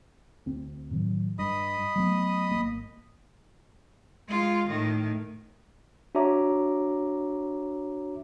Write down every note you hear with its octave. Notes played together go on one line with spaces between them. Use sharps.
D2 C4
A2 D#3 F#3
G2 D#5 B5 D#6
F#3 A3 B3
G#1 A#3
G#3 F4
A2 D#3
D4 F#4 C#5 E5 A#5 D6